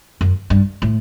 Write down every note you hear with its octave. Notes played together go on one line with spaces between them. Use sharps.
F#2
G2
A2